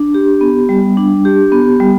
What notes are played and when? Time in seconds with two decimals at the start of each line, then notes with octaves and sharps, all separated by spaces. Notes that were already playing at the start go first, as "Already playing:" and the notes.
Already playing: D4
0.14 G4
0.41 B3
0.69 G3
0.97 D4
1.25 G4
1.52 B3
1.80 G3